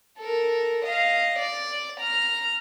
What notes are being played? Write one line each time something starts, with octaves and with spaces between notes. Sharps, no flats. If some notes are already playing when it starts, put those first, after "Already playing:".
A4 A#4
D#5 F5
D5
A#5 F6